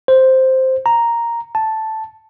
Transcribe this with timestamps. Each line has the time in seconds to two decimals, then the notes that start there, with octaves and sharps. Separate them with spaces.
0.08 C5
0.86 A#5
1.55 A5